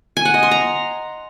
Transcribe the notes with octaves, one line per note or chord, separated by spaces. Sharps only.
G#5
F#5
D#5
C6
A#5